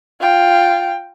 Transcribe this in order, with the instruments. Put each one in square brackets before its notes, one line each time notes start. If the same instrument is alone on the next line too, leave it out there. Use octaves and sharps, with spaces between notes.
[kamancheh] F4 G5